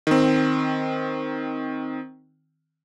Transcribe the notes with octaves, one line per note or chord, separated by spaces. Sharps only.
D#3 C4